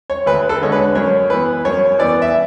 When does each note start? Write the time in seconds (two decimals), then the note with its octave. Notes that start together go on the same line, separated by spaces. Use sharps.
0.10 C#5
0.26 D2 B4
0.49 A4
0.62 D3 G#3 C#5
0.72 B4
0.95 F#2 C#5
1.30 E3 B3 B4
1.65 F#2 C#5
1.99 E3 B3 D5
2.22 E5